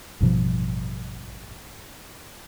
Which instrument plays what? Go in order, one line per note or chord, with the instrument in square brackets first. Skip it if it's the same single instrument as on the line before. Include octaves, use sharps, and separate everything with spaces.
[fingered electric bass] A1 G2 B2 F3